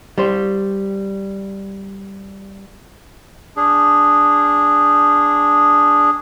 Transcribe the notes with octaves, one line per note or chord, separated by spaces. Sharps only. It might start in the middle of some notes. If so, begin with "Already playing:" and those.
G3 G4 C5
D4 G#4